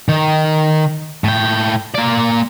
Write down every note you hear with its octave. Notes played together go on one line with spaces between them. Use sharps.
D#3
A2 G5
A#3 D5